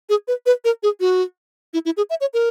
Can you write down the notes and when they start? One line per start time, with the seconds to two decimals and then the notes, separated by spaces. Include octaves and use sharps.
0.09 G#4
0.28 B4
0.46 B4
0.65 A#4
0.83 G#4
1.00 F#4
1.74 E4
1.85 E4
1.97 G#4
2.10 E5
2.21 C#5
2.34 A#4